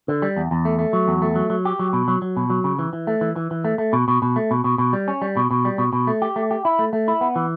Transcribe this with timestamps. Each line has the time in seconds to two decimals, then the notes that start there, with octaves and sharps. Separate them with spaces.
0.08 D3
0.22 G3
0.37 E2
0.51 E2
0.65 A3
0.79 A3
0.93 F#3
1.08 E2
1.22 A3
1.36 F#3
1.50 F#3
1.65 G4
1.79 F#3
1.93 B2
2.08 F#3
2.22 F#3
2.37 B2
2.50 F#3
2.64 C#3
2.79 E3
2.93 E3
3.07 A3
3.21 E3
3.36 E3
3.51 E3
3.65 A3
3.78 A3
3.93 B2
4.08 B2
4.22 B2
4.36 A3
4.51 B2
4.64 B2
4.78 B2
4.93 G3
5.08 C#4
5.22 G3
5.37 B2
5.51 B2
5.65 G3
5.78 B2
5.93 B2
6.07 A3
6.22 G4
6.36 A3
6.51 G4
6.65 E4
6.79 A3
6.93 A3
7.08 E4
7.21 B3
7.36 E3